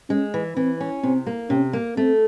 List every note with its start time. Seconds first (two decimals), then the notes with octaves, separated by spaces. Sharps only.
0.09 G#3 C#4
0.34 E3
0.57 E3 C4
0.80 C#4
1.03 C3 C4
1.26 A#3
1.49 C3 C#4
1.73 A#3
1.97 A3 C4